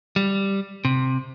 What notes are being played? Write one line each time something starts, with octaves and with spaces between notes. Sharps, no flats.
G3
C3